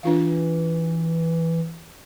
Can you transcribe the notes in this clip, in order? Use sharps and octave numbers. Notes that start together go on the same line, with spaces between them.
E3 D4 F4 F5